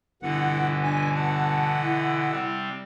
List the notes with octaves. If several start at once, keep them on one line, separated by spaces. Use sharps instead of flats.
G1 B2 D3 E3 E4 F#5
D4 G#5
F#5 A5
E4
C3 G3 C4